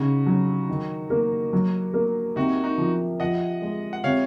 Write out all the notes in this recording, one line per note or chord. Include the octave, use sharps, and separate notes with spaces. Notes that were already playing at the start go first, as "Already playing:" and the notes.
Already playing: C#3 D#4 F#4
F#3
D#3
A#3
F#3
A#3
C3 D#4 F#4
D#4 F#4
F3
F3 D#5 F#5
G#3
F#5
C3 C#5 F5